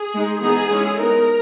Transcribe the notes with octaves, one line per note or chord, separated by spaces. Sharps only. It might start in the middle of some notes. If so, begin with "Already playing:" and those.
Already playing: G#4
G#3 D#4
E3 B3 D#4 G#4
G#3 C#4 E4
G#3 B3 D#4 A#4